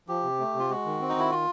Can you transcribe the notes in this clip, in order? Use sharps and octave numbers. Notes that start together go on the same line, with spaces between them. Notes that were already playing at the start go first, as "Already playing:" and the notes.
F3 G4
C3
A3
C3 F4
G#3 F#4
D#3
C4
D#4
D#3 E4
F4